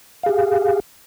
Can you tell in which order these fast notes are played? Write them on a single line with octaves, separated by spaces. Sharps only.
F5 G#4 G4